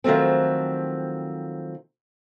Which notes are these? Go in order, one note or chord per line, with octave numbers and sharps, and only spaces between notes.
D#3 F3 F#3 A3 C4